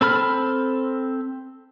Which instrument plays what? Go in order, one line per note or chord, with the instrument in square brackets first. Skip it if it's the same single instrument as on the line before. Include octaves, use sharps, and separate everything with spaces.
[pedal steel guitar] C4 A4 B5 F6